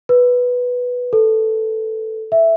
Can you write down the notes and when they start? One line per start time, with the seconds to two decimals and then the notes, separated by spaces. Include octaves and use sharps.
0.09 B4
1.13 A4
2.32 E5